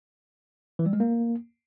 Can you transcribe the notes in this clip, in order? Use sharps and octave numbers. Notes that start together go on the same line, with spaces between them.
E3
G3
G#3
A#3